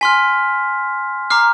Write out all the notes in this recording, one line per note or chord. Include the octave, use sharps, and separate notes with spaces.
G#5 C6 F6 B6
A#5 D6 F6 C7